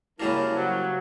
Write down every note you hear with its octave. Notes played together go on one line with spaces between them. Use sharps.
F#2 C#3 G3 A#3 E4 A#4 A5
F#3 C5